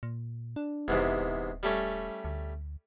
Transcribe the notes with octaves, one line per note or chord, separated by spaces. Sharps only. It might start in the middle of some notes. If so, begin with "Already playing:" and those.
A#2
D4
F1 E2 G#2 C3
D#1
G3 A3 C#4
D2